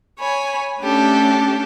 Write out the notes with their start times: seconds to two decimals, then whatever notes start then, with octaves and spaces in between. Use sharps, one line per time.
0.19 C#5 G#5 B5
0.80 A3 C#4 D4 G4 A4